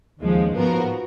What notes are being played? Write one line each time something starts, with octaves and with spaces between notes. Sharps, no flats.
D#2 C#3 F3 G#3
G#2 F3 B3 F#4 A#4